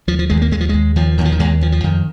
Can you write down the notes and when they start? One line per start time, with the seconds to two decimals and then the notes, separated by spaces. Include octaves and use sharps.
0.07 D#2 F3
0.19 F3
0.30 D#2 G#3
0.42 A#3
0.51 D#2 G#3
0.60 F3
0.69 D#2 G#3
0.96 D#2 F3
1.18 D#2 D#3
1.25 F3
1.32 D#3
1.39 D#2 G#3
1.61 D#2 F3
1.72 F3
1.84 F2 D#3